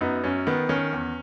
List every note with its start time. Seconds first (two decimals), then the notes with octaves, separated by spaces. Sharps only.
0.01 F#2 B3 D#4
0.24 F#2 C#4
0.47 D#3 B3
0.69 D#3 C#4
0.93 E2